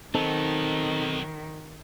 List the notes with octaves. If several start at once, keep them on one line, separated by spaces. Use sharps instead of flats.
D#3 F#3 B3 C4 D#4 A4